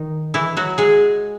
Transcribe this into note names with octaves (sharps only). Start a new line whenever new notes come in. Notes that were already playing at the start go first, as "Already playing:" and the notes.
Already playing: D#3 D#4
E3 E4
F#3 F#4
G#3 G#4